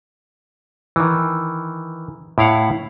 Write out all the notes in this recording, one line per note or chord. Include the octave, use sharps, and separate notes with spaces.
D#3 E3
A2 E4 F5 F#5